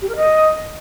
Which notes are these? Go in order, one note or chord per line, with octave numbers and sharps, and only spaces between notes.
G4
A#4
D#5